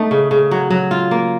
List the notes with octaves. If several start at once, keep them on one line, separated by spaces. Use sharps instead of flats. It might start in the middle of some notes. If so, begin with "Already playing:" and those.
Already playing: A3 D#4
C#3
C#3
F#3
F#3
F4
A#3